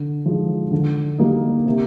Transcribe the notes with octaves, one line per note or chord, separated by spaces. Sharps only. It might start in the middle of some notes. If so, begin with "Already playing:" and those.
Already playing: D3
F3 G#3 D#4
D3
G3 A#3 D#4
C3